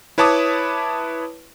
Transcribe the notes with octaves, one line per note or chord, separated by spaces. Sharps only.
E4 B4 C#5 A5 D6 D#6